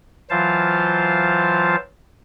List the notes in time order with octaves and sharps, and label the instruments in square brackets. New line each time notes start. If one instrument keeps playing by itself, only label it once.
[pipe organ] E3 F#3 F4 C5 F5 A5